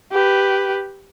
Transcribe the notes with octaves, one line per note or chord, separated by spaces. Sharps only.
G4 B4